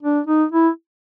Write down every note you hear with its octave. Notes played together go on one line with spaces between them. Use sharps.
D4
D#4
E4